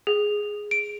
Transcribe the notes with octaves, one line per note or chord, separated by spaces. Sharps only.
G#4
D7